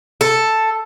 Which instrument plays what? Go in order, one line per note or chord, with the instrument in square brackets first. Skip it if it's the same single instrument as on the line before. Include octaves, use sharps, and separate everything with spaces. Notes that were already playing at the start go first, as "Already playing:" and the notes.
[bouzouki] A4